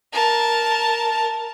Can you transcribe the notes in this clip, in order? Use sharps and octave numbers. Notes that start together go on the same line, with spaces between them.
A#4 A5